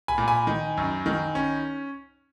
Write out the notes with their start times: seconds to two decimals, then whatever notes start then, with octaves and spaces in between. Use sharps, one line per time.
0.08 G#5 B5
0.18 A#2
0.28 G#5 B5
0.47 D#3
0.77 F#2
1.06 D#3
1.35 C#4